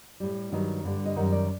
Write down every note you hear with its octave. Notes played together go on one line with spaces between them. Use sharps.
A2 G3
G2 D#3 F#3
G2 D3 G3
D#5
F#2 D#3 G3 F#5
D5